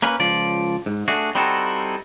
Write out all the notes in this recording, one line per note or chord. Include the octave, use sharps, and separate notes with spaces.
A#3 C#4 B4
C#2 F3 D5
G#2
A3 D4 F#4 G#4
G3 C4 D#4 E4 F#4 A4